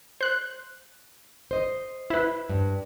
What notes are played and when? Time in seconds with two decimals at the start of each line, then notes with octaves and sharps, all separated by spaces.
0.21 C5 F#6
1.51 C5 D#5
2.10 E4 B4
2.49 G2